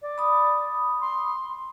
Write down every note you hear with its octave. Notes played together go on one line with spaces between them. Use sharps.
D5
B5 D#6
C6